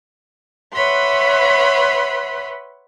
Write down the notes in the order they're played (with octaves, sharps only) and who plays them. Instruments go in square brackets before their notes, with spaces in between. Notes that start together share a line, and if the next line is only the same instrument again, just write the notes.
[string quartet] B4 C#5 E5 F#5 B5 C6